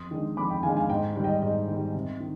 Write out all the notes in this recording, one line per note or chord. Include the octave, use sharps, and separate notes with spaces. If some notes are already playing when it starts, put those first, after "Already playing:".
Already playing: F2 C6 D#6
D#3 G#3 D4
F2 B5 D6
G5 B5
D#3 G#3 D4 F5 G#5
F5 G#5
G#2 D#5 G5
D#3 G3
D#5 G5
G#2 D#5
D#3 G3
C3
D#3